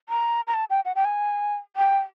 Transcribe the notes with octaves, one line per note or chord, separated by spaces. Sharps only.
A#5
A#5
A5
G5
F#5
G5
G#5
G5